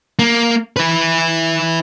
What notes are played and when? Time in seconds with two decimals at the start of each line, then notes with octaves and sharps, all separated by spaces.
0.19 A#3
0.76 E4 B4